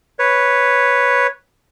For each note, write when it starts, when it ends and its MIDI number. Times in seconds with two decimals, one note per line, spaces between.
0.19 1.27 71
0.19 1.27 73